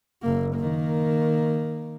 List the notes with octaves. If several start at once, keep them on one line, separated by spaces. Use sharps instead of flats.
F#1 A#3
D#3 A#3